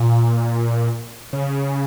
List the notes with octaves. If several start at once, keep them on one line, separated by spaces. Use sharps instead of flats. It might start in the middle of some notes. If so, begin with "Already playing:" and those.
Already playing: A#2
C#3